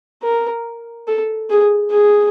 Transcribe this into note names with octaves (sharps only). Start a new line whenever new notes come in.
A#4
A4
G#4
G#4